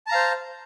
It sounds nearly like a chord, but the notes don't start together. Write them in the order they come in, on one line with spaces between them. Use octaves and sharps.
A5 A#5 F5 C5